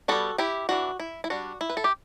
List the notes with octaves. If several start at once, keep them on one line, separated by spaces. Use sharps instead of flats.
G3 B3 D4 F#4 A4
E4 G4
E3 A3 D4 F#4
E4
E4
G3 D4 F#4
E4
B4
A4
G4